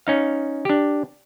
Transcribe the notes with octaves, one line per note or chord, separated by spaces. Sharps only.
C#4 D#4 F5
D4 G4